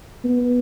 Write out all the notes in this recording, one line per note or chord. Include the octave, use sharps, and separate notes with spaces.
B3